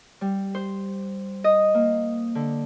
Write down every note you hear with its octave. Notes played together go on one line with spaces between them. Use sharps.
G3
C5
D#5
A#3
D3